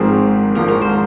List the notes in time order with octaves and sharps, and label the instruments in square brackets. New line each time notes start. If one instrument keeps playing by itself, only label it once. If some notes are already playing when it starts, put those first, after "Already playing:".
Already playing: [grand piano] G#1 G#2 F3 C4 [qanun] G#4 A#4 C5
[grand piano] G#1 G#2 F3 A#3 [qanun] A#4
[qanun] A#4
C5